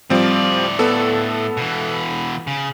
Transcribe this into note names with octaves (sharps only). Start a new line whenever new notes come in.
A2 F3 G3 C4 D5
B3 A4
B2 E3
C#3